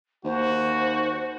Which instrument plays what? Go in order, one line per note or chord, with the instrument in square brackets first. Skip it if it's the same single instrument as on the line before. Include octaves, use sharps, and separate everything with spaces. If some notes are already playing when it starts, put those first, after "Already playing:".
[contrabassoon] D#2 [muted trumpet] F#4 [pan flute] C5